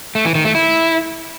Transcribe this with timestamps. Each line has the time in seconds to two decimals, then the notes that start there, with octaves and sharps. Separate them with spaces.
0.15 A3
0.25 E3
0.35 D#3
0.45 A3
0.55 E4